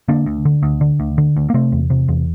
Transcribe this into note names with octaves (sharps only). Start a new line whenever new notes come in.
D3 A#3 D4
D2
D3
D2
D3
D2
D3
D2
A#3
C3 A3 C4
E2
C3
E2